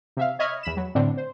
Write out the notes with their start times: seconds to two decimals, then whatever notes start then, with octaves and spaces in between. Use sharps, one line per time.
0.17 C3 E5 F5
0.39 C#5 D#5 E5 B5 F6 G#6
0.63 E2 B5 E7
0.77 F#3
0.95 A2 D3 C4 D4
1.17 C5